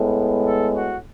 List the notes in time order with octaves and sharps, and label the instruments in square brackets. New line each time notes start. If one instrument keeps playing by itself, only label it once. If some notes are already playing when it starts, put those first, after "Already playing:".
Already playing: [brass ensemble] A2 G#3 B3
A4
F#4